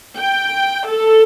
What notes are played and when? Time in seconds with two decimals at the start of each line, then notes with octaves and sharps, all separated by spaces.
0.19 G5
0.88 A4